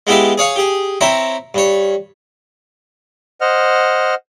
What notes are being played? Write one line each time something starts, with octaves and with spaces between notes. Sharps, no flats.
G#3 B3 E4 G4 E5 F5
G#4 C#5 F5 C#6
G4 G#4
C4 E4 C5 C#5 E5 A#5
G2 C#5
C5 D#5 F#5 F6